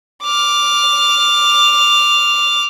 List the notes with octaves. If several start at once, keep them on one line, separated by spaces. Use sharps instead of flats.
D6 F6